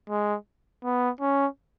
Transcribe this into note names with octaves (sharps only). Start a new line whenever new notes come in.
G#3
B3
C#4